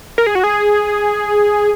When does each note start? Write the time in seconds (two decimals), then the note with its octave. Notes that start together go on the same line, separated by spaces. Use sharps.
0.18 A#4
0.27 G#4
0.35 F#4
0.44 G#4